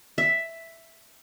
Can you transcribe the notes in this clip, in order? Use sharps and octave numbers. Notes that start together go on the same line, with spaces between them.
E5